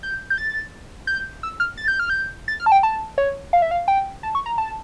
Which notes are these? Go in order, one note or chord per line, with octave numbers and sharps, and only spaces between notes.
G6
G6
A6
G6
E6
F6
A6
G6
F6
G6
A6
F6
A5
G5
A5
C#5
F5
E5
F5
G5
A5
C#6
A#5
A5